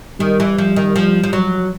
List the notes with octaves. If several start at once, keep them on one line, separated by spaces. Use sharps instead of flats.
D#3 G3
E3
F3
D#3
F3
F3
F#3